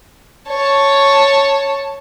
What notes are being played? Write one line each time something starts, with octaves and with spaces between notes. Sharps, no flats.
C#5 A5